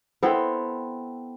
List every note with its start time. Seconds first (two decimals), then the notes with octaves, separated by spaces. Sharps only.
0.23 B3 C4 E4 A4